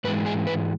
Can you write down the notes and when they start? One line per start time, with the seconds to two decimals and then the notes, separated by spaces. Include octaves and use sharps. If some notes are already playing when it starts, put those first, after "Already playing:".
0.04 G#2 E3 G#3 B4
0.26 G#4
0.47 B4